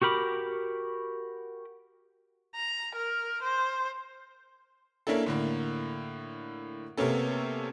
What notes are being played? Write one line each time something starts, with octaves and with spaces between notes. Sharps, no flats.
F#4 G4 A#4 B5 D6
A#5
A#4
C5
A#3 C#4 D4 E4 A4
A2 D3 A#3
C3 A#3 B3 C#4 A4